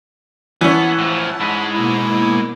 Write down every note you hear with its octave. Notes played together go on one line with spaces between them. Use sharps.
E3 B3 C#4 F#5 A5
A2 F3
G#2 G#3 B5
B2 A#3 E4 D6